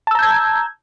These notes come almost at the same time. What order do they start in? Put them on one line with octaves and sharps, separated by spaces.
A5 E6 A#5 G6 G#6